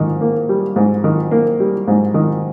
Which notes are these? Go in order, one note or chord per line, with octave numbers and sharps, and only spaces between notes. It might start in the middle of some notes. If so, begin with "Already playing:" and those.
Already playing: G#2 D#3
A#3
G3
G#2
D#3
A#3
G3
G#2
D#3